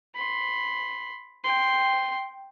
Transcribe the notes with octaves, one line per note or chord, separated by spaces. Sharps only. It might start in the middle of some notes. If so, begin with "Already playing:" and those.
B5 C6
G5 C6